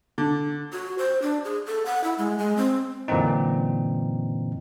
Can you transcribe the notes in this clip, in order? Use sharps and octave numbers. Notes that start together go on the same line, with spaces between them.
D3
F#4
C5
D4
G#4
A4
F#5
E4
G#3
G#3
C4
F#2 A#2 D3 E3 C4 D#4